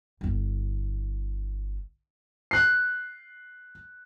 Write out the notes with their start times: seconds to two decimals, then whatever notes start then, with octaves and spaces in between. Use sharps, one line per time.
0.21 G1 E4
2.51 F#6 C7